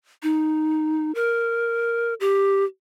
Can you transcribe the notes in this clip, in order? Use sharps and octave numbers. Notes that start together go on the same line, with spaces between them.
D#4
A#4
G4